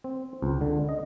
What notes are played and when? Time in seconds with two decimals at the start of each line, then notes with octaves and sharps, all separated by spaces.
0.04 C4
0.42 C#2
0.61 D3
0.89 D#5